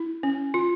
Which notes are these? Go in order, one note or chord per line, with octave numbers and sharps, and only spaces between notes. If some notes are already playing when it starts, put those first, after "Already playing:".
Already playing: E4
C#4
F4